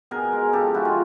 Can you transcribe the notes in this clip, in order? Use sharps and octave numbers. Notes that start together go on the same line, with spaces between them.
B2 G#4 A#4
G#3
C#3 G4 A4
F3 G#3 E4 F#4
D#4 F4